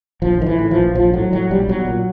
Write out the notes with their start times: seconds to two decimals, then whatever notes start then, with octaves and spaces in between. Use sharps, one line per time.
0.22 A#1 F3
0.40 A2 D#3
0.46 E3
0.59 A2
0.71 F3
0.78 A#1
0.95 A#1 F3
1.14 A2 F#3
1.32 A2 F#3
1.50 A#1 G3
1.68 B1 F#3
1.87 A#2